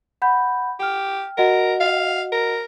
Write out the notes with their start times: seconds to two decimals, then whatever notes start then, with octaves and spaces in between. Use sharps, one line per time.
0.22 F#5 B5 G6
0.80 G4 G5 F6
1.38 F#4 A#4 D#5 F#5
1.80 F5
2.32 A#4